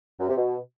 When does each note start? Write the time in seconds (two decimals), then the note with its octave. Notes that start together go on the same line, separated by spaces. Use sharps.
0.20 F#2
0.28 C3
0.37 B2